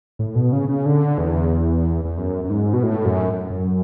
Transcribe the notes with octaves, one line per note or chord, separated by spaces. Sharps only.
A2
B2
C#3
C#3
D3
E2
E2
F#2
F#2
G#2
B2
A2
F#2
F#2